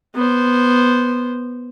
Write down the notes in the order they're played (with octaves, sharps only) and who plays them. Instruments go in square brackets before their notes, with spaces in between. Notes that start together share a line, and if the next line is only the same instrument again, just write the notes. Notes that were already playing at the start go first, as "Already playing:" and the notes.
[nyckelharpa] B3 C5